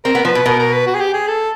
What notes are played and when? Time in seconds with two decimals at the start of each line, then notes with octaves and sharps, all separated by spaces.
0.05 C4 A#4
0.15 B3
0.25 F3 B4
0.35 B2
0.46 B2 A#4
0.59 A#4
0.73 B4
0.87 F#4
0.95 G#4
1.00 G4
1.14 G#4
1.28 A4